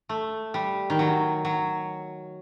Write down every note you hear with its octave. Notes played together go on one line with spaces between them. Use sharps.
A3
G3
D#3
F#3
F#3